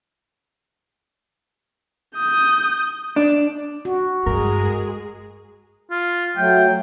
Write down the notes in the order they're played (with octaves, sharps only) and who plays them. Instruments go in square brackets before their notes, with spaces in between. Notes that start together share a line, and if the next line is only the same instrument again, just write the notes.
[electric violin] D#6 G6
[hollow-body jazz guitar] D4
[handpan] F#4
[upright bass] G2 [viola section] G#3 G#4 [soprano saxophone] A#4
[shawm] F4
[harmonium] F#3 A3 [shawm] G5